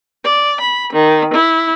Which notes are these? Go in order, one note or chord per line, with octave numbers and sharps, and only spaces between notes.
D5
B5
D#3
E4